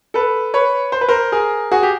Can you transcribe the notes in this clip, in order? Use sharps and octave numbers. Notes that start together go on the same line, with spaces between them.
A4 B4
B4 C#5
C5
B4
A#4 C5
G#4 A#4
F#4 G#4
G4